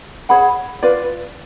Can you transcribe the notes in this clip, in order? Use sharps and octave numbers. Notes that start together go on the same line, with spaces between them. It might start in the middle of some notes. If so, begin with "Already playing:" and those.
G#4 C#5 F#5 B5
F4 B4 D5 F5